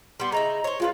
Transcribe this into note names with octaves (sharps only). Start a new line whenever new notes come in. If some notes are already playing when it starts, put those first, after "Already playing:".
G3 B3 C6
C#3 D#4 E4 D#5 A#5
C5 C#5
G#3 A3 F4 B4